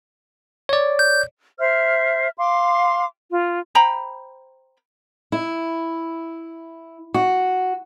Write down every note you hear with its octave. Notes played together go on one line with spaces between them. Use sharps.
C#5 D5
G6
C5 E5 F6
F5 C6 D6
F4
C5 G5 A#5 B5
E4
F#4